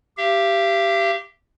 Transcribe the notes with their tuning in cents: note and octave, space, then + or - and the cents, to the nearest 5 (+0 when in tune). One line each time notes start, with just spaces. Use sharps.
G4 +0 F5 -45